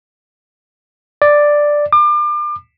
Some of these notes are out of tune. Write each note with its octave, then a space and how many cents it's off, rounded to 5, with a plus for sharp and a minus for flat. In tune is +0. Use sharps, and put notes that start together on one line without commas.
D5 +5
D6 +35